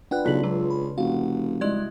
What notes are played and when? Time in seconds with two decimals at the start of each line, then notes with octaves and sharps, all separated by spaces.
0.11 D4 F4 B4 F#5 G5 F#6
0.25 B1 C#3 F4 A4 F#6 B6 F#7
0.43 C#2 F#3 F4
0.70 B5
0.98 F1 F#4 F5
1.61 G3 G#3 E4 D5 D#5 G#6